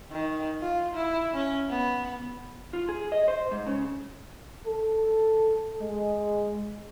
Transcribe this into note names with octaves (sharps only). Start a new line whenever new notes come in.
D#3
F4
E4
C#4
B3
F4
G#4
D#5
C5
G#2
C#3
A4
G#3